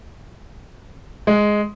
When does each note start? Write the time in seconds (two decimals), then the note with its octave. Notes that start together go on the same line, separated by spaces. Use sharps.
1.27 G#3